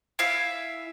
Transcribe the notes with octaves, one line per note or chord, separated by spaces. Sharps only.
E4 E5 F5 G#5